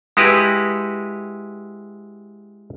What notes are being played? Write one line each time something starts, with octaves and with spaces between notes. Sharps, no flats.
G#3 E4 F#4 G4 B4